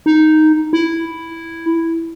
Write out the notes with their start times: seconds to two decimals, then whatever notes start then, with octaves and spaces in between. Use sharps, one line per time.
0.06 D#4
0.73 E4